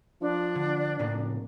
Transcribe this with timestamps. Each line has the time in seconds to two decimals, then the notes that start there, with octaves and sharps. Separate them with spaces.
0.21 F3 D4
0.55 D3
0.99 A2 C#3 A#3
1.12 F1